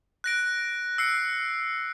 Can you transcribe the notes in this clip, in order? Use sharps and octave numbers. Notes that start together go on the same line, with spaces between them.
F#6 A#6 D7
E6 C7 C#7